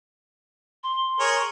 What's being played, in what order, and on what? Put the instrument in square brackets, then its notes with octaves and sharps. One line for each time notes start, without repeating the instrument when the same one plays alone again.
[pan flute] C6
[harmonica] G#4 A#4 C#5